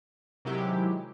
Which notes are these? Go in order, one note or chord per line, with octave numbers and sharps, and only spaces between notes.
C3 D#3 F#3 G#3 E4 G4